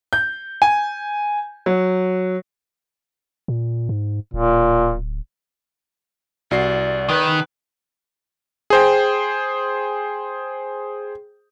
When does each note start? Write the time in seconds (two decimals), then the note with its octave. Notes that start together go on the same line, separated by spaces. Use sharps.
0.13 G6
0.62 G#5
1.66 F#3
3.48 A#2
3.89 G#2
4.34 D1 A#2
6.51 C2 F#4 D5 C7
7.09 E2 D#3 B4
8.70 G#4 C5 G5